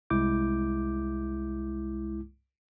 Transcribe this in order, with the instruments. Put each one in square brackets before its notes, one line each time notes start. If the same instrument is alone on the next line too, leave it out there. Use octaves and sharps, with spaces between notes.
[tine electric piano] C2 G#3 E4 D6 G6